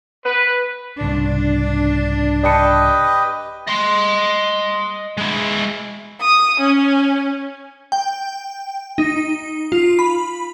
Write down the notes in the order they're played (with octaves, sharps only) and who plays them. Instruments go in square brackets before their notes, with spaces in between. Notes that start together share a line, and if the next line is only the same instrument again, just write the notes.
[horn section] B4
[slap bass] C2 G#2 C#3 [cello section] D4
[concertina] G4 B4 D#5 [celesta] D5 A5 C#7
[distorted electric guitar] D#5 C6
G#3 E4
[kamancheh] D#6
C#4
[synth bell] G5
D#4
F4
B5